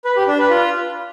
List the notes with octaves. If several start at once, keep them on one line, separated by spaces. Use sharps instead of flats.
B4
G4
D4
B4
F4